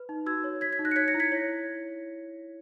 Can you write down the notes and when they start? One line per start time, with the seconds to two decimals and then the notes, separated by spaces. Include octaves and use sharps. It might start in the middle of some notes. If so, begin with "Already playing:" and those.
Already playing: B4
0.09 D#4
0.26 F#4 E6 G#6
0.44 C#5
0.61 C#5 G#6 B6
0.72 G#6 B6
0.79 D#4
0.85 F#6 A#6
0.91 C#7
0.96 C#5 G#6 B6
1.08 A#6 C#7
1.14 E4
1.20 G#6 B6
1.32 C#5